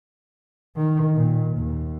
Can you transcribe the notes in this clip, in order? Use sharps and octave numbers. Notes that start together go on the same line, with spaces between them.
D#3
A#2
D#2